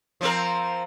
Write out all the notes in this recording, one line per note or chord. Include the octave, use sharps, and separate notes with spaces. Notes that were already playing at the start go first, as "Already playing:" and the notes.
F3 C4 A#4